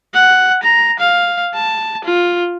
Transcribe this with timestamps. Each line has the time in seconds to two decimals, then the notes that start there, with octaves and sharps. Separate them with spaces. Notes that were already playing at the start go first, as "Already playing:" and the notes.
0.14 F#5
0.63 A#5
1.00 F5
1.54 A5
2.05 F4